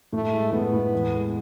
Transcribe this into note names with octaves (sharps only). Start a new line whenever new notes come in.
A2 A3
G#3
A2 B3
A2
E2
G#3